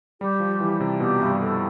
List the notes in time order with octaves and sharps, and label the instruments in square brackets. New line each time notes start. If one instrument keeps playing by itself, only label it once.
[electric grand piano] G3 [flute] G4
[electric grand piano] F3
E3
C3
[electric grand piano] B2 [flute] G4
[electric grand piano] G2
[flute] A4